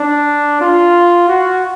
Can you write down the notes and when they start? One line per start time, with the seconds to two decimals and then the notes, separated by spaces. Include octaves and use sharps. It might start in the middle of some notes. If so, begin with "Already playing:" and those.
Already playing: D4
0.61 F4
1.28 F#4